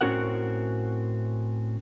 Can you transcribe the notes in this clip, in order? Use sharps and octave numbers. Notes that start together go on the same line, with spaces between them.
A2 C4 C#4 F#4 A#4 F#5